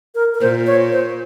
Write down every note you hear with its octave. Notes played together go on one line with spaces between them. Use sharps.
A#4
A#4
A#2 C5
C#5
C5